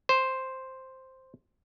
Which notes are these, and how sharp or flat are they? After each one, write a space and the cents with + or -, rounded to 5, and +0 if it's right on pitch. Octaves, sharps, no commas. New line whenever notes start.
C5 +0